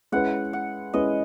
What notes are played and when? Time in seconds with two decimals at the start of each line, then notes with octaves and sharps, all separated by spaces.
0.12 G#3 C#4 E4 B4 F#5
0.53 F#5
0.93 G#3 C#4 E4 B4 D#5